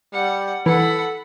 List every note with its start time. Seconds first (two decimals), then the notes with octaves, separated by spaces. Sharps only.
0.13 G3 F#5
0.66 E3 A4 F#5 B5